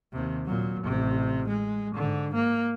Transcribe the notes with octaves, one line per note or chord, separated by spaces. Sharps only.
D#2 C3
A#2 F#3
A1 C3
G#3
G#2 D3
A#3